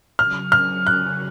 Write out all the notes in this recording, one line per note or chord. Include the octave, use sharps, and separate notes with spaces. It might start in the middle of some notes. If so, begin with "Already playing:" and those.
C#3 F#3 C#4 F6
F6
F#6